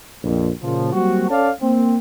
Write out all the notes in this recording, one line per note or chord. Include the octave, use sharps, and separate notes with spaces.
A#1 F2
A#2 C#3 F3
F#3 G3 A#3 C4 F#4
C#4 A4 C#5 D5 F5 A5
A#3 C4